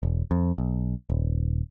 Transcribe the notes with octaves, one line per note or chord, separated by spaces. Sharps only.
E1
F2
B1
D#1